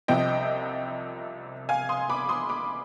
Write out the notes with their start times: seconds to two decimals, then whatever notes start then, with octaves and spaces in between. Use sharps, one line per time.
0.08 C2 C3 F3 D#5 G5
1.69 F5 G#5
1.89 C6 D#6
2.10 B5 D6
2.29 C6 D#6
2.49 B5 D6